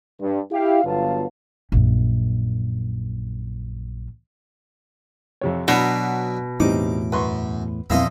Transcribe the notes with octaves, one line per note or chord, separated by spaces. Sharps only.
G2
E4 G4 F5
G1 F#3 B3 F4 F5 A5
A#1 F#2
F2 C3 C#5
B2 F#3 D4 B4 D5
E2 A2 G3 C4 D#4 D6
F#2 B4 C6 C#6
A#1 E2 C4 E4 D#5 F5 C6 E6